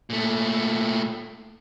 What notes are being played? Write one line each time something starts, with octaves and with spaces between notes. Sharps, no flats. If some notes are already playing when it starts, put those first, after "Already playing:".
A#2 A3